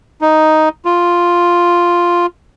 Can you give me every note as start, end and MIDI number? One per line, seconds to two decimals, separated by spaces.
0.21 0.69 63
0.85 2.26 65